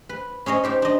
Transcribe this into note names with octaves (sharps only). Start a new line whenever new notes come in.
B4
C#4 G#4 C#5 D#5
D#4 G4 C5
D4 D#5